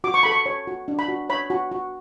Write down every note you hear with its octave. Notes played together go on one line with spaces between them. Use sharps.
F#4 D6
C#6
A4 B5
C#6
C#5
F#4
D4
B5
F#4
C#5 B5
F#4
F#4